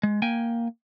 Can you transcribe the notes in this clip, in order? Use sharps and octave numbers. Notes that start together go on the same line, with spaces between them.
G#3
A#3 G5 G#5